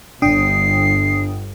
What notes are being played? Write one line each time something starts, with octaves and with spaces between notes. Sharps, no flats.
G1 D4 G5 D#6 C7